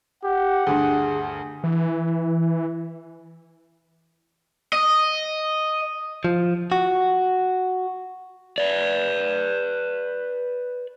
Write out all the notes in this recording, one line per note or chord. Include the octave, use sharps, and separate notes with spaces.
G4 F#5
D2 G2 G#4
E3
D#5
F3
F#4
B4 D5